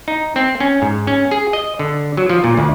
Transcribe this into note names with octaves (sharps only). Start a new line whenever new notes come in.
D#4
C4
C#4
G#2
C#4
G#4
D#5
D3
F#3
F3
A#2
D2